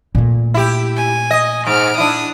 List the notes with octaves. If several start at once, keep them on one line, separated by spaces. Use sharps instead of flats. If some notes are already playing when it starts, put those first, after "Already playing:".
A#2 A3
E4 G4
G#5
D#5
G#2 F6 D7
D4 E4 D#6